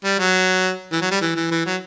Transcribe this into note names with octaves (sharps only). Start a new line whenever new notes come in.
G3
F#3
E3
F#3
G3
E3
E3
E3
F#3